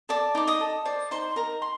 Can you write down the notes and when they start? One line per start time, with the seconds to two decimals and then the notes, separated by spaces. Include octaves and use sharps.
0.09 A4 D5 D6
0.35 D#4 D6
0.48 D#5 D#6
0.61 A4
0.85 C5 D5 D6
1.11 D#4 C5 C6
1.36 D#4 A#4 A#5
1.62 C6